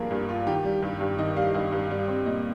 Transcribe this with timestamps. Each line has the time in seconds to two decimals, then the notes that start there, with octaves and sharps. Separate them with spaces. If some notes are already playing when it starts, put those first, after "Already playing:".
Already playing: G2 F3 A#3 G#4 A#4
0.11 G2
0.29 F4
0.47 D#3 G4
0.65 G3
0.82 G2
1.01 G2
1.18 D#3 D#5
1.36 G3 F5
1.54 G2 D#5
1.72 G2
1.90 G3
2.08 C4
2.26 A#2 D#5